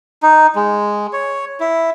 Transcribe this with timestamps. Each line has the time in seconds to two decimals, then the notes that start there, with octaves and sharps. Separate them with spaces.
0.23 D#4
0.56 G#3
1.13 C#5
1.60 E4